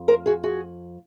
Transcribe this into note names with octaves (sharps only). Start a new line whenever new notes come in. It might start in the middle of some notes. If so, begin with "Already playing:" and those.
Already playing: F2 F3
A#4 C5
F#4 G#4
F#4 G#4